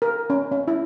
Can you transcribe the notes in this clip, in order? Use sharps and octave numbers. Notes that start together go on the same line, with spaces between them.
A#4
C#4
C#4
E4